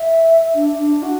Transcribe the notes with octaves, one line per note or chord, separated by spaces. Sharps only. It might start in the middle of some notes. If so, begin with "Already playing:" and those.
Already playing: E5
D4
D4
F#4